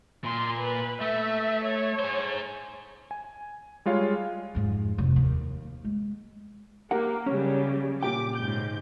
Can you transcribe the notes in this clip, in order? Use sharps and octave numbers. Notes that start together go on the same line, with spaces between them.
A#2 C6
B4
A3 E5
C#5
G#4 C5
G#5
G3 G#3 F4 C#5 F5
F2 G#2
F1
D#2
G#3
A#3 G4 A#4 F#5
C#3 F#3 G3 C#4
A#2 G4 G5 D6
G#2 C#3 G6